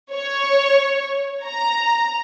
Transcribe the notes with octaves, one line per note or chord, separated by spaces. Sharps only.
C#5
A#5